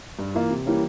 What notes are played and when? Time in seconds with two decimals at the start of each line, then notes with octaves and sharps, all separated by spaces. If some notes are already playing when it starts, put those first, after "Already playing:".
0.19 G2
0.35 E3 A#3 F4
0.50 C3
0.66 E3 G3 A#3 C#4